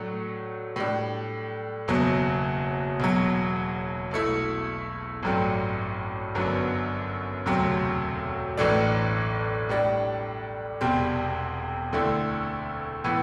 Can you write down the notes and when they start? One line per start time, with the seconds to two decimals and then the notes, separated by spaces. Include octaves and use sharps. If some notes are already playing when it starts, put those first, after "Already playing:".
Already playing: A2 F#3 A3 D4
0.76 A2 G3 D4
1.88 F#1 E2 B2 F#3
3.00 E1 E2 B2 F#3
4.11 B1 B2 A3 E4
5.23 A1 G2 F#3 A3 C4
6.35 G1 F#2 D3 F#3 B3
7.46 E1 D2 C3 F#3 C4
8.57 A1 A2 E3 A3 D4
9.69 A2 G3 D4
10.81 E1 E2 C3 G3 C4
11.93 D2 D3 A3 C4 E4
13.04 A2 E3 B3 E4